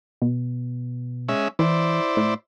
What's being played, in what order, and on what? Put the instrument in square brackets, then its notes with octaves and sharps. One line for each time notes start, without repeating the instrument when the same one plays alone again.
[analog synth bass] B2
[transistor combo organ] G#3 C#4 E5
[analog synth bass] E3 [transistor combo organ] E4 C5 D5
[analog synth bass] A2